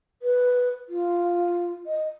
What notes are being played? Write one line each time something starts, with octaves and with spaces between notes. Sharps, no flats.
B4
F4
D#5